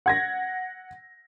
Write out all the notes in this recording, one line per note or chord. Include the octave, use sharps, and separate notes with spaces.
F#5 G#6 A#6